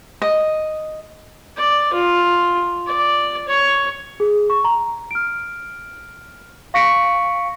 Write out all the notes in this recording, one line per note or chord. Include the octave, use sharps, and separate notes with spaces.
D#5
D5
F4
D5
C#5
G#4
C#6
A#5
F6 D7
F5 C#6 A#6 B6 C#7 D7